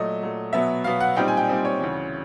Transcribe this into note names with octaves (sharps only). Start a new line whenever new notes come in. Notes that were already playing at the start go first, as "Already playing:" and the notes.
Already playing: A#2 F#3 A3 D#5
A#2 F#3 A3
B2 F#3 B3 E5
B2 F#3 B3 F5
F#5
A#2 G3 C4 D#4 G5
G#5
G5
A#2 G3 C4 D#4
C#5
D2 C#3 E3